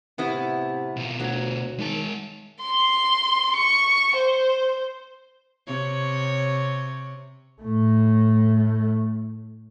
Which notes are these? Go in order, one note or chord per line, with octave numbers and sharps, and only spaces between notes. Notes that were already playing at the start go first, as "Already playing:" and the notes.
A2 C3 B3 E4
B2 F4
D2 F#3
D#3 G#3 A5
C6
C#6
C5
C3 C#5
A2 A3